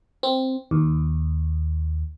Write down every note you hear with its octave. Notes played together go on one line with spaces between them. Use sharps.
C4
D#2